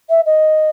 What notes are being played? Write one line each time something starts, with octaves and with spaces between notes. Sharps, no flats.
E5
D#5